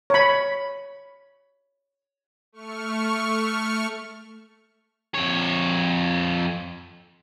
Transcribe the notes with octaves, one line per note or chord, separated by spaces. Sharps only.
C#5 B5
A3 C#6 F6
F2 C#5